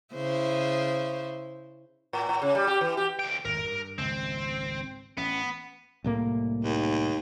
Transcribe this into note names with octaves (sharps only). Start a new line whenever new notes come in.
C#3 E4 C5
A2
A2
C#3
G3
G4
E3
G4
D2 G5
G#1 F2 A2 A#4
G2
G#1 C#2 C4
A1 B3 C#4
C2 A2 A#3
D#2